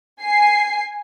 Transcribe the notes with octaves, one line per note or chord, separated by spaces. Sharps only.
G#5 C7